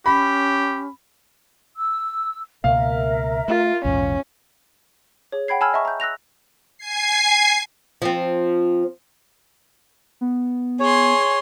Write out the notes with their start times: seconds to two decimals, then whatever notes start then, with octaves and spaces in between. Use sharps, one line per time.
0.06 C#4 G4 B5
1.78 E6
2.64 C#2 B2 A#3 A#4 E5 F5
3.48 A3 F4
3.85 A#1 E2 G#2 C#4
5.32 G#4 C#5
5.48 F#5 G5 B5 G#6 C7
5.61 G#5 A5 B5 E6 F6 G#6
5.73 D#5 E5 A5 C#6
5.85 A#5 G6
6.00 E6 F#6 A#6 F7
6.77 G#5 G#6 C7
8.02 F3 C4
10.21 B3
10.80 G#4 C#5 C6